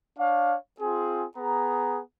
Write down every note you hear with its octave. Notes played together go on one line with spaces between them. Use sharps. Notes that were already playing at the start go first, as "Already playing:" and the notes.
D4 C#5 F5
C4 F4 G#4
B3 G#4 A#5